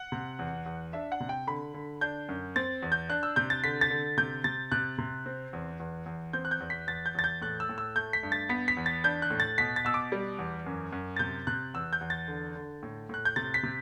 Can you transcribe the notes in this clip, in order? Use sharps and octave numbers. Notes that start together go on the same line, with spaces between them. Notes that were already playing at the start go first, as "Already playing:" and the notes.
Already playing: F#5
C3
E2
E2
D4 E5
F#5
C3
G5
D3 B5
D3
D4 G6
F#2
C4 A6
E2
G6
D4 F#6
E6
C3 G6
A6
D3 B6
A6
D3
C3 G6
C3 A6
C3 F#6
C3
C4
E2
E2
E2
C4 G6
F#6
G6
E2
B6
E2 A6
G6
E2 A6
G6
A2 F#6
E6
A2
E6
A3 G6
B6
G2
A6
B3 B6
B6
E2
A6
D4 G6
F#6
A2
A6
B2 B6
A6
B2 E6
D6
G3
E2
F#2
F#2
A6
C3 G6
C3 F#6
E2 E6
G6
E2
A6
D3
D3
A2
A2 F#6
G6
C3 A6
B6
C3